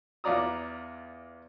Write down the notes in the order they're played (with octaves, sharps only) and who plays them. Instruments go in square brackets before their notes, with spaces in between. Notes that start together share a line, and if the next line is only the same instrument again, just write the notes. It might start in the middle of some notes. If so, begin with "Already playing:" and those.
[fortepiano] E2 F4 D5 A#5 D#6